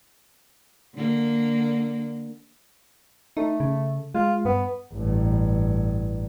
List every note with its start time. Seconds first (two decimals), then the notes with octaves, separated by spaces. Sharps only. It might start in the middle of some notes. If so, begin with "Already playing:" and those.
0.95 D3 A#3
3.37 A3 D#4
3.60 C#3
4.15 G#3 F4
4.45 G2 B3
4.93 A1 G2